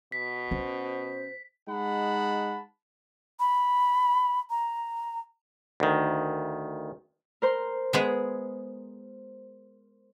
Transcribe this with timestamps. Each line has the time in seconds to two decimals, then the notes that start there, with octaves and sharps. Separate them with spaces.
0.12 B2 B6
0.51 C#4 C5
1.69 G#3 D#4 F#5 A5 B5
3.40 B5
4.50 A#5
5.80 D2 D#3
7.42 A#4 C5 C6
7.93 G#3 B3 G#4